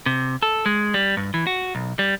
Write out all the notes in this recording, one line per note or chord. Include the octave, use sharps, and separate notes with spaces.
C3
A4
G#3
G3
G2
E3
F#4
B1
G3